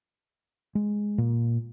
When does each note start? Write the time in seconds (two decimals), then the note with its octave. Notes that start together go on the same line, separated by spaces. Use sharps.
0.75 G#3
1.18 A#2